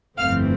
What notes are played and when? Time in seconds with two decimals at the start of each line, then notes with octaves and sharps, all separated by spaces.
0.18 G1 F2 E3 A3 C4 F5 F6